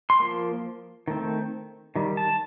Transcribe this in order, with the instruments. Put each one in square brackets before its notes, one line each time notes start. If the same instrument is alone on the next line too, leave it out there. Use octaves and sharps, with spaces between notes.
[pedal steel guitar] C6
F3 A#3
D#3 A3 C4
D#3 G3
A5